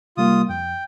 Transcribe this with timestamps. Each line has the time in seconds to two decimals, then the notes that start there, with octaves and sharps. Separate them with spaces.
0.17 C3 G3 A#3 F4 D#6
0.49 F2 G5